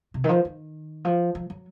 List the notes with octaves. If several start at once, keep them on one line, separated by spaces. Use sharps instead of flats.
C3
D#3
F3
D#3
F3
F3
F#3